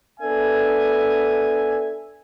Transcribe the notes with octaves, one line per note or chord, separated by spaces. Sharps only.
B3 D4 A4 E5 G#5